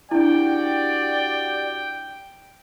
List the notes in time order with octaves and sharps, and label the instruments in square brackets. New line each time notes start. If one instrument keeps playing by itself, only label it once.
[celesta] D4 E4 [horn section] F#4 G4 D5 [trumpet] G5